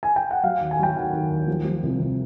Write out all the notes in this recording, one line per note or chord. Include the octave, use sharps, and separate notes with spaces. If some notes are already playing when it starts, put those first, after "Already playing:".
G#5
G5
F#5
F#3 F5
D#2
G#5
F#3 G5
D#3 F#5
D#3
D#2
F3
F3
C2
C2